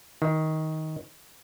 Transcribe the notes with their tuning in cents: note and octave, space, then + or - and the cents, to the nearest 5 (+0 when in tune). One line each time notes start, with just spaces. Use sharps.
D#3 +15